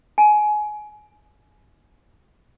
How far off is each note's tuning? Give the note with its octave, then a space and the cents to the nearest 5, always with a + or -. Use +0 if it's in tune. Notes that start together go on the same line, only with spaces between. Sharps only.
G#5 +25